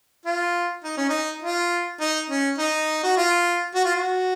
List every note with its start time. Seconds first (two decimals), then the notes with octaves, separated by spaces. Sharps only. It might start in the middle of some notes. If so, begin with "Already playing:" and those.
0.26 F4
0.84 D#4
0.97 C#4
1.10 D#4
1.43 F4
2.00 D#4
2.30 C#4
2.58 D#4
3.03 F#4
3.17 F4
3.75 F#4
3.85 F4
3.96 F#4